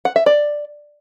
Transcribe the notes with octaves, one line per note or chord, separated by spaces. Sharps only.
F#5
E5
D5